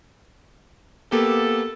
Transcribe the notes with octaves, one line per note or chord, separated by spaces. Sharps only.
A#3 B3 G4 A4